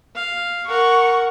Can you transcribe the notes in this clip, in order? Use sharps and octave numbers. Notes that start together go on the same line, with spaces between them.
F5
A#4 F#5 C#6